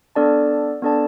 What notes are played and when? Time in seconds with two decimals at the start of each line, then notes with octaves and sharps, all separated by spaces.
0.16 B3 D4 A4 D5 A5
0.82 B3 D4 A4 D5 A5